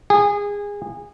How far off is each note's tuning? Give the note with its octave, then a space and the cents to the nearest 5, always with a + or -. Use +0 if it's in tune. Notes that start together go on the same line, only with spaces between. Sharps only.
G#4 -25